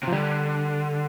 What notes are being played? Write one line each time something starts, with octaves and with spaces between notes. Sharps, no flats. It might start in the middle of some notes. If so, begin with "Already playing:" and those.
C3
F3
D3 G3